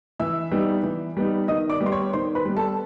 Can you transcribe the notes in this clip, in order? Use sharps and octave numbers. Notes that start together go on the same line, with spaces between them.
E3 E5 E6
G3 B3 D#4
E3
G3 B3 D#4
D#3 D#5 D#6
D5 D6
G3 B3
C6
C#5 C#6
D#3 C5 C6
B4 B5
G3 B3
A4 A5